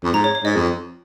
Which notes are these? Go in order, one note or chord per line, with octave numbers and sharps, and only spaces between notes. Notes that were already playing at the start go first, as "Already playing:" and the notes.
F2
G#2 A#5
C#5
C#5
G#2 D#5
F2